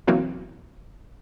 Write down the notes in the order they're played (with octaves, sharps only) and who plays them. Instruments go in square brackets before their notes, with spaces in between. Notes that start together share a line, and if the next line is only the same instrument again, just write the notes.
[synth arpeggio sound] B2 E3 F#3 A#3 C4